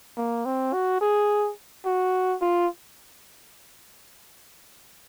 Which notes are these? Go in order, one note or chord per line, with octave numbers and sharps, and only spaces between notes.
A#3
C4
F#4
G#4
F#4
F4